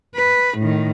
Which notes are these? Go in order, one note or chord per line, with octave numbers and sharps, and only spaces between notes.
B4
A2 D#3